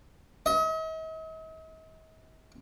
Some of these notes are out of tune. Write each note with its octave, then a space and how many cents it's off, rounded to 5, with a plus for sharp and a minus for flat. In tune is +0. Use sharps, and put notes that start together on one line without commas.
D#5 +45